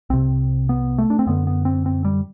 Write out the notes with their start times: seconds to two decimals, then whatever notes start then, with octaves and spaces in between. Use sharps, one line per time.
0.10 C2 C3 C4
0.69 B3
0.98 A3
1.10 D4
1.19 C4
1.27 F#2 D3 B3
1.47 B3
1.65 C4
1.86 C4
2.05 G3